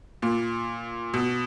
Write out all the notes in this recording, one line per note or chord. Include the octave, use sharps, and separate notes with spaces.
A#2
B2